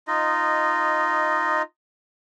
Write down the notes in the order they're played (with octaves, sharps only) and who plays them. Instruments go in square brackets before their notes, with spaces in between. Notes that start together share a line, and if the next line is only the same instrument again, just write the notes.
[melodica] D#4 F4 D#5